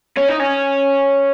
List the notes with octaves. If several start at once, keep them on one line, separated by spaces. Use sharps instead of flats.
C#4
D#4
C#4